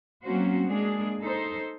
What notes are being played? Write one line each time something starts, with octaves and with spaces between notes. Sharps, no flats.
F#3 A#3 C4 C#4 F#4 C5
G#3 A#3 D4 G#4
D#4 A4 C5